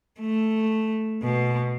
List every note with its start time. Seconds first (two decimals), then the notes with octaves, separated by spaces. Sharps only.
0.20 A3
1.22 B2